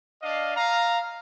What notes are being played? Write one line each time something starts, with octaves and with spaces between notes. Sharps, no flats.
D4 D#5 F5
F5 A#5